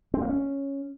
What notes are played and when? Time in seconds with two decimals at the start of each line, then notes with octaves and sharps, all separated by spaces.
0.14 C4
0.22 A#3
0.29 C#4